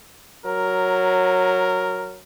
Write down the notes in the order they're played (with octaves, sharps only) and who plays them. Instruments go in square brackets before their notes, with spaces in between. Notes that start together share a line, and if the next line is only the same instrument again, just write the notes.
[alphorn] F#3 [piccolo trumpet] A#4